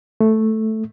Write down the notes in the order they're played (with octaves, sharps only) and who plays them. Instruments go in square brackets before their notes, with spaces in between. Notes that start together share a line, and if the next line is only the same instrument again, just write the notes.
[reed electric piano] A3